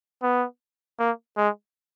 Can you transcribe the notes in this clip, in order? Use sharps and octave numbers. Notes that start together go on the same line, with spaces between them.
B3
A#3
G#3